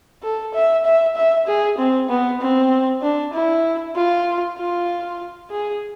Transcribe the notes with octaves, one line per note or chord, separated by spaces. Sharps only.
A4
E5
E5
E5
G#4
C4
B3
C4
D4
E4
F4
F4
G#4